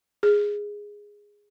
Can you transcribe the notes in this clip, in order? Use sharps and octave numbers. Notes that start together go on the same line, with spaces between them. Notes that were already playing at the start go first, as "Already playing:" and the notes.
G#4